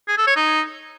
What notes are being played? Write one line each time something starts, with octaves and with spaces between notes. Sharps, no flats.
G#4
A4
C#5
D#4